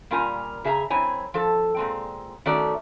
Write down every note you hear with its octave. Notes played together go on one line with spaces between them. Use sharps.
A#2 G3 C#4 F4 A#4 G#5
C#3 G#4 E5 A5 A#5
F#2 C4 E4 C#5 G#5
F3 A4
A#2 G#3 C4
D#3 A3 C#4 F#4 D5